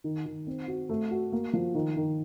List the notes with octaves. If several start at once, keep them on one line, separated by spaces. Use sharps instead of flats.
D#3
D#3
C4
F#4
A3
F#4
A#3
F3
D#3
D#3